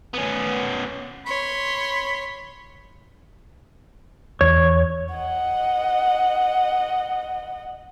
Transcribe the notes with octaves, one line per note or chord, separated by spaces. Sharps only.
B3 C#4
C#5 B5 C6
E2 C#5
D#5 F#5